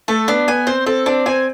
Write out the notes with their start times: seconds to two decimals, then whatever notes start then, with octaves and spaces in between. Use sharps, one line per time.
0.08 A3 A4
0.28 B3 D4
0.47 B3 G#5
0.67 C4 C5
0.86 C4 A4
1.06 C4 D4
1.26 C4 G#5